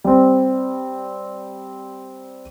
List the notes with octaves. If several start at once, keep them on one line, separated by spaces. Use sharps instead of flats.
G3 C4